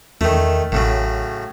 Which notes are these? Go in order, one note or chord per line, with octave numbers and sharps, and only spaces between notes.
E2 D#3 A3
A1 A2 C#3 F#3